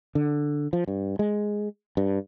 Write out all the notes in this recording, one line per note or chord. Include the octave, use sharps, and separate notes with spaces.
D3
F3
G2
G#3
G2